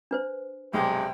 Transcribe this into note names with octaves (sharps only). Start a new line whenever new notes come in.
D4 B4 C5
B1 G2 C3 G#3 G5